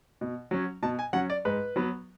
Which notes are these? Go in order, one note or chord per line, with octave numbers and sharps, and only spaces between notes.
B2
F#3 C#4
B2 A5
G#5
F#3 C#4 F#5
D5
G#2 B4
F#3 B3